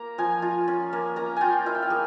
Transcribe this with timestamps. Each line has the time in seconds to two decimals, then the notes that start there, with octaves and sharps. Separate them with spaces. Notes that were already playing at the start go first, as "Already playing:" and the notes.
Already playing: A#3 A#5
0.18 F3 G#5
0.42 F4
0.68 C#4
0.93 A#3
1.16 A#3 A#5
1.37 F4 G5 G#5
1.66 E4 F5
1.75 G5
1.82 F5
1.90 A#3 G#4